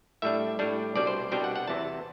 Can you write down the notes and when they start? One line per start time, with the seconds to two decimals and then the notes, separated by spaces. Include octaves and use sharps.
0.22 A2 G3 D4 E5
0.59 A2 G3 D4
0.95 C2 B2 G3 D4 D5
1.07 C5
1.32 C2 B2 G3 D4 G5
1.44 F#5
1.56 F#5
1.68 E2 C3 E3 A5